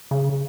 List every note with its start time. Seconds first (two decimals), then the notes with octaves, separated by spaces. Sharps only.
0.11 C#3